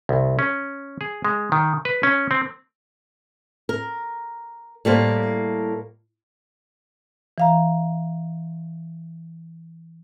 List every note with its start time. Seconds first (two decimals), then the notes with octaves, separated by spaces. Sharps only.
0.09 C2
0.39 C#4
1.01 G#4
1.25 G#3
1.52 D#3
1.85 B4
2.03 C#4
2.31 C4
3.69 A#4
4.85 A2 G3 A#3 C5
7.38 E3 F5 A#5